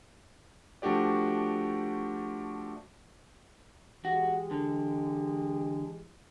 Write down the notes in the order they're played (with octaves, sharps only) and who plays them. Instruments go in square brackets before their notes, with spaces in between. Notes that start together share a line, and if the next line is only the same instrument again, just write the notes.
[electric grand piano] F3 A3 D4 F#4 G4 D5
[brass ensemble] E3 G#3 G4 [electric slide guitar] F#4
[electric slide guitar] D3